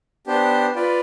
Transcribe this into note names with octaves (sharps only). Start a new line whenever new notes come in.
B3 D4 G4 C5
F4 B4 D5